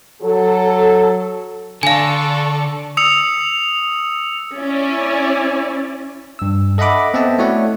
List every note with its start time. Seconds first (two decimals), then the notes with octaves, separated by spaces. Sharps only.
0.22 F#3 A4
1.83 D3 A4 D5 F5 G#5 C#6
2.97 D#6 E6 C#7 F7
4.57 C#4 E4 D5
6.39 G2 E6
6.78 A4 D#5 E5 F#5 B5 D6
7.14 B3 C4 A4 D#5 E5 A5
7.38 A3 E4 F#4 C#5 D5 F#5